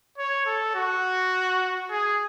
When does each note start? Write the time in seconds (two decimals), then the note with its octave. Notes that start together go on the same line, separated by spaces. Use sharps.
0.18 C#5
0.46 A4
0.75 F#4
1.90 G#4